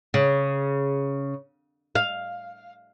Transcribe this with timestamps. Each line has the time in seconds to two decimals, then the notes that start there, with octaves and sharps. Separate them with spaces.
0.14 C#3
1.95 F5